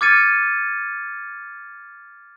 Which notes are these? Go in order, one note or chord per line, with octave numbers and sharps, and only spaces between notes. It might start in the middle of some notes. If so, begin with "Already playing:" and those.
D6 F6 G#6 A6 C#7 D#7